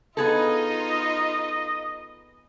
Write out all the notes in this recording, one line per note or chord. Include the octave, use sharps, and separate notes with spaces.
B3 D#4 F4 G#4 A4 D#5